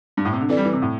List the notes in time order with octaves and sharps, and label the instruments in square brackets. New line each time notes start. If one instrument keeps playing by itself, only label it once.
[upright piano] G2
A2
C3
D3
[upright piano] E3 [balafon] C4 A4 D5
[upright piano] G3
E3
C3
A2